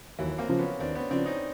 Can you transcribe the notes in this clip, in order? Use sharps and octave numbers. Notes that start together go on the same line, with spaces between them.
D#2 E3 F#3
A#3 C4
C#3 F3
B3 C#4
D#2 C4 D4
B3 C#4
C#3 F3 C4 D4
C#4 D#4